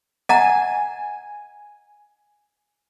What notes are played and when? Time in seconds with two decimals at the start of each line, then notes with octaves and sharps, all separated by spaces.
0.29 D#5 F#5 G#5 A#5